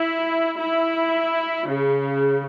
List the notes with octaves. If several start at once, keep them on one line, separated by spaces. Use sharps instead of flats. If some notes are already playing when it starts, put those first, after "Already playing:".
Already playing: E4
E4
C#3